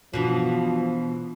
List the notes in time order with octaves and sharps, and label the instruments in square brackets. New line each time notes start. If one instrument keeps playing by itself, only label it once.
[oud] B2 E3 D4 [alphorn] F3